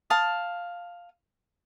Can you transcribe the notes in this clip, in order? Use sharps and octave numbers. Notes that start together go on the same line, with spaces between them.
F5 A5 D#6